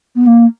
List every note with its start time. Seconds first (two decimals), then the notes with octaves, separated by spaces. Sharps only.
0.15 B3
0.26 A#3